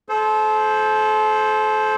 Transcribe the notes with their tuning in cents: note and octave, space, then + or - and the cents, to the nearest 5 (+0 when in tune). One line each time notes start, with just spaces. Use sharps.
A4 -35 C5 +0